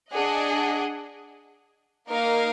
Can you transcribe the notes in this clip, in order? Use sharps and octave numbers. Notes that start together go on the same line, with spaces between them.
D4 G#4 D#5 F#5
A#3 D#4 A#4 F5